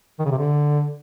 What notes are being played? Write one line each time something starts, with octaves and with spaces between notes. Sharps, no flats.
D#3
C#3
C3
D3